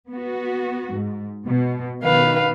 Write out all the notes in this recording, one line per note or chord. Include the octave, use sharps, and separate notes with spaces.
B3 F#4
G#2
B2
B2 D#3 B4 F5